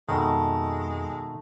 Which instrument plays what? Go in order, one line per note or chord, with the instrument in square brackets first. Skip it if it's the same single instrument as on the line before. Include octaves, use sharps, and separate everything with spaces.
[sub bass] F2 [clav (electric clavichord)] B2 D#3 [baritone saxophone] G#3 [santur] A3